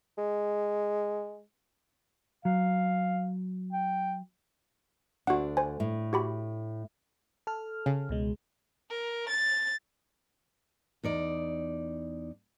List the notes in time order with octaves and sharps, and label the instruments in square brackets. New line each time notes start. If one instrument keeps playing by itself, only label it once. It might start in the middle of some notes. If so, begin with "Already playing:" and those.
[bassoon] G#3
[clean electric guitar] F#3 [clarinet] F5
[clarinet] G5
[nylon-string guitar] D2 D4 [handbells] F#4 F#5
[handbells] C5 G#5
[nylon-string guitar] A2
[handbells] F#4 G4 B5
[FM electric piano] A4 F6
[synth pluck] C#3
[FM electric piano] C#2 B2 G#3
[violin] A#4
A6
[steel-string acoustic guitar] E2 D#4 D5